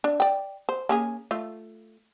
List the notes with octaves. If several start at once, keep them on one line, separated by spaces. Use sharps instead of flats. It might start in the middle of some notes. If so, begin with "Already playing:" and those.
D4
D5 G5
C5
A#3 C#4 G#4
A3 F4